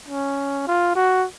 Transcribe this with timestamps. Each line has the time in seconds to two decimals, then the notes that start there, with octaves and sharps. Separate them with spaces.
0.08 C#4
0.67 F4
0.95 F#4